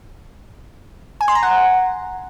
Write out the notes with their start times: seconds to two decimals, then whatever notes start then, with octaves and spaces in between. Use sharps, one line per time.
1.21 G#5
1.28 C6
1.35 A#5
1.43 F#5